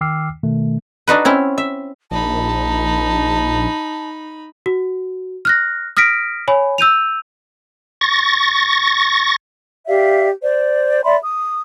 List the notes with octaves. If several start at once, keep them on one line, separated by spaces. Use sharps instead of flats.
D#3 G5 D6 E6 F6 C7
B2 D#3 A3
D4 D#4 F#4 B4
C4 C#4 E4
E5
A#1 D#4 A5 B5
F#4
F6 F#6 A#6
D#6 F6 A#6 B6 D7
C#5 G#5 B5
E6 G6 D#7 F7
C#6 A6 A#6
G4 D5 E5 F5
C5 D5
D5 E5 B5 C6
D#6